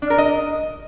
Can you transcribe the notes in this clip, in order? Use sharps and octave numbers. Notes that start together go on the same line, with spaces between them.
D4
A#4
D#5